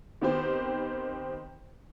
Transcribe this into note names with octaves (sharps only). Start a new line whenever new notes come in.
D#3 B3 C4 G4 C5